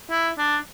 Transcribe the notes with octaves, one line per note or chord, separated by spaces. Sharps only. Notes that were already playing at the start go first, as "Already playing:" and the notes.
E4
D4